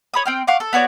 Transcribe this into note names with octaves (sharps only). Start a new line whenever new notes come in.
C#5 B5 D#6
C4 G5 F6
F5 F#5 C#6 D6
A4
B3 F#4 C#5 D5